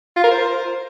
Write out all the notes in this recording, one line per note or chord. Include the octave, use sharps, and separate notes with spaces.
F4
A#4
C5